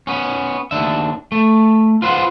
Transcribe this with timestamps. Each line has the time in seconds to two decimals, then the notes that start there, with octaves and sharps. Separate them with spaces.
0.07 B3 C#4
0.71 D#2 D4 E5
1.32 A3
2.02 F4 B4 C5 E5 F#5